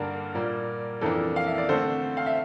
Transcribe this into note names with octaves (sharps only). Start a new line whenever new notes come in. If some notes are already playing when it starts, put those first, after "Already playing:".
Already playing: G2 D3 G3 A#3 D4 A#4 D5
A#2 G3 A#3
F2 E3 A#3 D4 A4
F5
E5
D5
D3 A3 C4 A4 C5
F5
E5